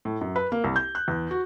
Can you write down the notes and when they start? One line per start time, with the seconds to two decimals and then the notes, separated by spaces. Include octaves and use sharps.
0.05 A2
0.21 F#2
0.36 B4
0.52 A#3
0.64 C2
0.76 G6
0.95 F#6
1.08 E2
1.31 F#4